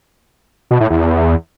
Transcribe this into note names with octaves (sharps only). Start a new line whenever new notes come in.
B2
A2
E2